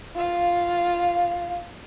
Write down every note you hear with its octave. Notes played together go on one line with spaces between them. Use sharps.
F4 F5